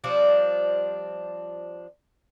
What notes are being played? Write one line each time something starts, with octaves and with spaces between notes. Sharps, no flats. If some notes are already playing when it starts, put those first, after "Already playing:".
F3 G3 C4 D4